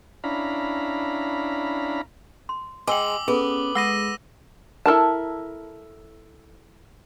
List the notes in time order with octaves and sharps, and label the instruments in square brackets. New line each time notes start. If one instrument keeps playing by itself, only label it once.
[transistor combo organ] C#4 D4 E4 F5 A#5 B5
[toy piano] C6
[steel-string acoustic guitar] G#3 [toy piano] G5 G#5 [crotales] D6 E6 F#7
[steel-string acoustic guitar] B3 [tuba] C#4 [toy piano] G#4 A4
[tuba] G#3 [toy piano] F#5 B5 D#6 [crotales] E6 A#6 D#7
[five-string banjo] E4 A4 A#4 A5